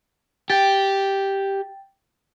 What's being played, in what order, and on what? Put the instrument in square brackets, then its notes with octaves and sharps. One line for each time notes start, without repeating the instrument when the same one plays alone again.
[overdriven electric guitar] G4 [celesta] G5 G6 A6